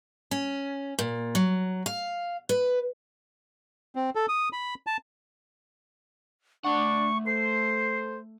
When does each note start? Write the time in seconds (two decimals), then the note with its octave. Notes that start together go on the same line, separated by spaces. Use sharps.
0.31 C#4
0.99 A#2
1.35 F#3
1.86 F5
2.49 B4
3.95 C4
4.15 A4
4.28 D#6
4.53 B5
4.87 A5
6.65 A3 D4 F#5 C#6
7.26 A4 C5 C7